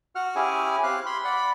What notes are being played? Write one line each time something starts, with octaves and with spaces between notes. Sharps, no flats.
F#4 F#5 F6
C#4 E4 G4 G#4 G#5
C4 G4 F5 F#6
B5 C6
D5 F#5 B5